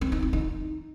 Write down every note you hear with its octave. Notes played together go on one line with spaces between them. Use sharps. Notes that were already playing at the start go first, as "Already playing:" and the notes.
C4
D#4
F4
D#4